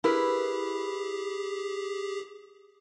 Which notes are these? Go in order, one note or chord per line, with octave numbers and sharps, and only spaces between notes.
E4 G4 G#4 A#4 B4